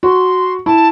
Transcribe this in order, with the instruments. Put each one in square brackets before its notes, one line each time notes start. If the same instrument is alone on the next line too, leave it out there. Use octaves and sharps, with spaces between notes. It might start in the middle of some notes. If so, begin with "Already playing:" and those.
[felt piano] F#4 [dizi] C6
[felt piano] E4 [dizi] A5